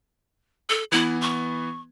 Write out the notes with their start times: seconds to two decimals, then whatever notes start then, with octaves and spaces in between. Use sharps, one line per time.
0.69 A4
0.92 E3 B3 E4
1.21 C#6